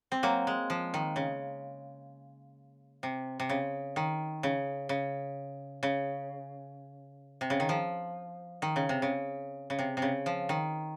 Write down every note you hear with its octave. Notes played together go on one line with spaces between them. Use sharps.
C4
F#3 A#3
G#3
F3
D#3
C#3
C3
C3
C#3
D#3
C#3
C#3
C#3
C3
C#3
D#3
F3
D#3
C#3
C3
C#3
C#3
C3
C3
C#3
F3
D#3